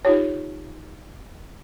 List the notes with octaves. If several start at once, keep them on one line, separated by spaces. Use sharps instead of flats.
D#4 F4 G4 C#5